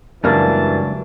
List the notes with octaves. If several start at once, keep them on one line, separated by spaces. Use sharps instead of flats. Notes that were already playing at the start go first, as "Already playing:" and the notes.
C#2 F#2 E3 F#3 G3 A#3 D4 A5